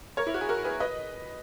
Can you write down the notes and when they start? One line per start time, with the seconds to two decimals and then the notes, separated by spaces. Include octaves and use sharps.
0.17 A#4 C#5
0.27 E4
0.34 F#4
0.41 G#4
0.49 F#4 A#4
0.64 G#4 B4
0.80 B4 D#5